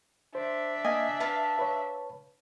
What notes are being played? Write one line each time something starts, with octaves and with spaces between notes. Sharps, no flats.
D4 C5 E5
A#3 D#5 F5 G#5
B4 F5 A5
B4 C#5